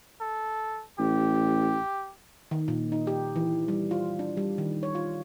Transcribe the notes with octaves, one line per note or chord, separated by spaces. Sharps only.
A4
A1 G4
D#3
A#2
D#4
G4
E3
G3
F4
D4
G3
D#3
C#5
F4